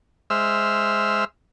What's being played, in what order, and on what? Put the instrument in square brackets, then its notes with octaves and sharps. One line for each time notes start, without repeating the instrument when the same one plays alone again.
[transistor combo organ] G#3 C5 E5 E6 F6